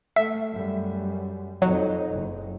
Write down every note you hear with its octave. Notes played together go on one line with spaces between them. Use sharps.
A3 E5
F#2 G3
F2 F#3 D#4
F#1